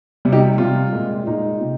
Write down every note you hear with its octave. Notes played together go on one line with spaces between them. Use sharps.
C3 G3
D#4 G4
C3 G3 F4
A#2 G#3
A#2 G#3 D#4
C3